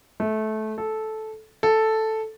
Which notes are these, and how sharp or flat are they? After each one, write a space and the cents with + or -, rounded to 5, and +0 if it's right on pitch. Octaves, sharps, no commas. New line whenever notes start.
A3 -20
A4 -10
A4 +0